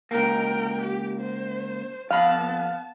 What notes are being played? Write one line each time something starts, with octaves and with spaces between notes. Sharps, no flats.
C#2 A#3 A#4 G5
G4
C5
F2 B3 F5 A5 B5